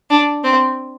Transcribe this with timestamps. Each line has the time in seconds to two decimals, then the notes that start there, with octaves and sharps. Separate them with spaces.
0.10 D4
0.44 C4